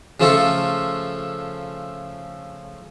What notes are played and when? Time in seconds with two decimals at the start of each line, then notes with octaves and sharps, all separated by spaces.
0.20 C#3 F3 A3 C#4 F4 A4